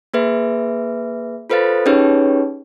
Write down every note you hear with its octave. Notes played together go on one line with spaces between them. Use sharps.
A#3 G#4 B4 E5
F4 A4 B4 C5 F5 A6
C#4 D#4 G4 G#4 B4 C#5